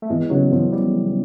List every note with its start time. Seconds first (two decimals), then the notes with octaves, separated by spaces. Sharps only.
0.02 A3
0.10 E2 G#3
0.30 C#3 F#3
0.51 E2 F3
0.72 G3